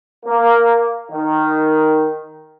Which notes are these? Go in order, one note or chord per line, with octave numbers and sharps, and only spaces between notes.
A#3
D#3